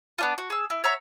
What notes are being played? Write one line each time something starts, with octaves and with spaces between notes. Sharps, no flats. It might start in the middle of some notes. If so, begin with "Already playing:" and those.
B3 D4 F4
F#4
G#4 E6
E4
C#5 E5 F#5 A#5